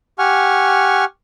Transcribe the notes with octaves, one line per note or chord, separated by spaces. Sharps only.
G4 F#5 G#5 C#6 F6